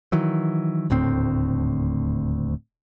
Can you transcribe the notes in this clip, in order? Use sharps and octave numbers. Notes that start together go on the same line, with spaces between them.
D#3 E3 F#3
D#1 D2 A2 C4